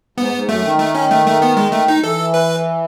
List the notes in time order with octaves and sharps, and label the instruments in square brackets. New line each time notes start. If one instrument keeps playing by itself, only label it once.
[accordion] G#2 [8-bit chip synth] B3
[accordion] G#2
[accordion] F#2 [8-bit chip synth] A3
[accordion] D#3
[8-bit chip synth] A3
C#4
A3
A3
B3
G#3
A3
D#4
[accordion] E3 [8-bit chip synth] A4
[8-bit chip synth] B4